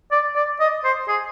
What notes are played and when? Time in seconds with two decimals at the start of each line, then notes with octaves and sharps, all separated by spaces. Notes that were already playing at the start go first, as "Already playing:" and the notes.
0.12 D5
0.36 D5
0.60 D#5
0.84 C5
1.08 G#4